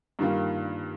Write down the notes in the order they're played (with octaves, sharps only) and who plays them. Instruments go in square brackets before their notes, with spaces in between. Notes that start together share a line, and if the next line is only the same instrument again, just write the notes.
[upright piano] G2 D#3 G3 A#3 F4